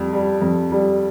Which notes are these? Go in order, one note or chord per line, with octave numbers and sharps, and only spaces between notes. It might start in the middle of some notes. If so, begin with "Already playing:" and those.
Already playing: F2 G3
G3
F2
G3